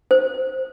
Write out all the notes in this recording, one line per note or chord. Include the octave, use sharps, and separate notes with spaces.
C5